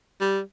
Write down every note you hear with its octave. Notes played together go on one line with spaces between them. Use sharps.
G3